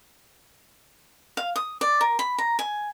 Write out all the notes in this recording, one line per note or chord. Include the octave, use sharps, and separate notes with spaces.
F5
D#6
D5
A#4
B5
A#5
G#5